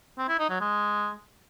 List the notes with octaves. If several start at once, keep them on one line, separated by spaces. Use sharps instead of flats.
C4
E4
D#4
F#3
G#3